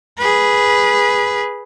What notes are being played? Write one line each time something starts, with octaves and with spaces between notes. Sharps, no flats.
G#4 B4